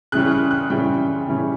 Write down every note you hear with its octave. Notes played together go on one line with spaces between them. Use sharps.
C#3 E3 G3 C#4 F#6
F#6
F#6
C#3 E3 G3 C#4 G5
C#3 E3 G3 C#4